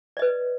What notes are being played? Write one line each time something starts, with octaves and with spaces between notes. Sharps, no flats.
B4 D5 D#5